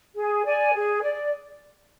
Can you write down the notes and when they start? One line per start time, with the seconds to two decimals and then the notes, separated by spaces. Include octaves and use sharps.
0.15 G#4
0.44 D5 G#5
0.73 G#4
1.02 D5